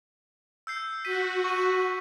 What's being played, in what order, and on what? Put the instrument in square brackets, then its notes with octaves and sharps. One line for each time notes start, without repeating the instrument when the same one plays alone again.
[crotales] E6 G6 C7
[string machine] F#4 [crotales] B6 D#7
[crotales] C#6 D#7